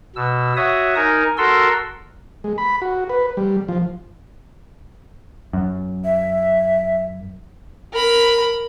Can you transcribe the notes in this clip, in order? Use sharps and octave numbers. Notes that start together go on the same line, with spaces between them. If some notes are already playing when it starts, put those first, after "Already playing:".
B2 E6
F#4 C#5 E5 D#6
D#4 A#4 G#5
F#4 A4 A#4 C6 E6
G#3
B5
F#4
B4
G3
F3
F#2
E5
A#4 B5